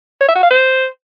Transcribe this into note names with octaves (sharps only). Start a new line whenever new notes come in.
C#5
E5
F#4
F5
C5